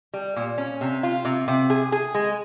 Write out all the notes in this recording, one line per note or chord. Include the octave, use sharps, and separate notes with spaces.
G3
A#2
C#4
C3
F4
C3
C3
G#4
G#4
G#3